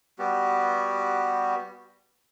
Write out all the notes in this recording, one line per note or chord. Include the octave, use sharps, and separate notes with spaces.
G3 B3 F#4 G4